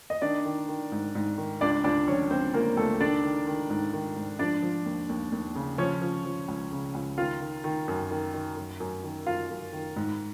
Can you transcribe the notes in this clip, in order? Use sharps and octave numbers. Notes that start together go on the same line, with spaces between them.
D#5
D#3 D4 D5
D#3
D#3
G#2
G#2
D#3
C#2 D4 D5
C#2 D4 D5
F3 C#4 C#5
C#2 C4 C5
C#2 A#3 A#4
C#2 A3 A4
D#3 D4 D5
D#3
D#3
G#2
D#3
G#2
F3 D4 D5
F3
D#2
D#2
D#2
C#3
F3 C#4 C#5
F3
F3
C#2
C#3
C#2
D#3 F4 F5
D#3
D#3
F#2
D#3
D#3
F#2
F#2
D#3
F#2 F4 F5
F#2
D#3
G#2